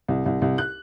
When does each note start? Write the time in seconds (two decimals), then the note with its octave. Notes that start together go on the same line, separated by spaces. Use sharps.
0.09 C2
0.26 C2
0.42 C2
0.58 F#6